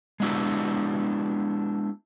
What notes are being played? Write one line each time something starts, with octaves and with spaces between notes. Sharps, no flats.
G#3 B3 D4 E4 G4